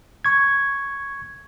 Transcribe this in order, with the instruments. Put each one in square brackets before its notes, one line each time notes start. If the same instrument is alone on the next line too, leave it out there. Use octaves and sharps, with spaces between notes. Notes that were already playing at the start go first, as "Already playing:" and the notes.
[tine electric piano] C#6 G#6